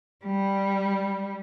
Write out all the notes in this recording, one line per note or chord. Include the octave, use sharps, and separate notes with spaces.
G3